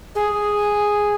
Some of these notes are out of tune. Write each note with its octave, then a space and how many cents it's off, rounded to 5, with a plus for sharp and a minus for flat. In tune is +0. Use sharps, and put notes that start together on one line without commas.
G#4 -5